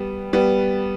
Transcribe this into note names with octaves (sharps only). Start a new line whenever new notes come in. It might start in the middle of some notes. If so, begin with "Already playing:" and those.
Already playing: G3 B3
G3 B3